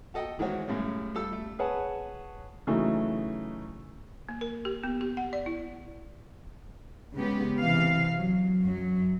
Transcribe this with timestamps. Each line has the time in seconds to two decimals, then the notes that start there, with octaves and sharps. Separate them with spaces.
0.14 F#4 A4 D#5 F#5 G5
0.39 D#3 E3 G#3 C4 F#4 C#5
0.67 F#2 A2 C#3 G3 G#3 C#4
1.15 G3 F4 A4 E6
1.33 A3
1.59 G#4 B4 C#5 F#5 A5
2.67 C#3 E3 F#3 A3 D#4
4.29 A#3
4.41 A#4
4.65 G4
4.83 B3
5.01 G4
5.17 F#5
5.33 D5
5.46 E4
7.15 C#3 G#3 B3 G4
7.58 C3 E3 F5
8.15 F#3
8.63 F#2 F#3